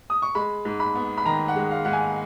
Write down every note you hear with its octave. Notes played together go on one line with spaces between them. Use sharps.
D#6
C#6
G#3 B5
G#2
B5
B3
B5
D#3 A#5
F#5
G#3
F5
G#2 F#5
G#5